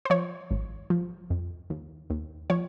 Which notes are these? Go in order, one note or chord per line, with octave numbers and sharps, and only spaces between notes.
C5
F3 C#5
G#1
F3
F2
D#2
D#2
F3 C#5